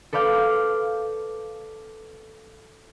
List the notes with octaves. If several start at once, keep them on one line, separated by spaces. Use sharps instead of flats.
A4 B4 D5 F5 G6